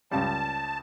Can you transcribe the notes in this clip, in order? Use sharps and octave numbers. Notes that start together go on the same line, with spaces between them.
C#2 C#3 G3 A5